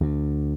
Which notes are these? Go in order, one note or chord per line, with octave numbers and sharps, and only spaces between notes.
D2